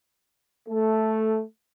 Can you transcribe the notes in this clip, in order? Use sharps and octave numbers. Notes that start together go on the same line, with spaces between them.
A3